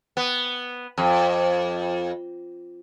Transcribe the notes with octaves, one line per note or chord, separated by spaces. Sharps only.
B3
F2